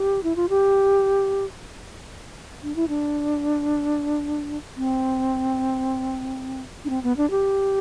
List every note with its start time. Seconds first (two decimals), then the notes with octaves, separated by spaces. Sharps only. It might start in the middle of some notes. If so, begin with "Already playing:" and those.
Already playing: G4
0.23 E4
0.36 F4
0.49 G4
2.63 D4
2.76 E4
2.88 D4
4.77 C4
6.85 D4
6.90 C4
7.03 B3
7.17 D4
7.30 G4